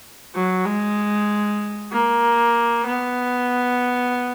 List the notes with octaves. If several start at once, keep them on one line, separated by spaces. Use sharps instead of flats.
F#3
G#3
A#3
B3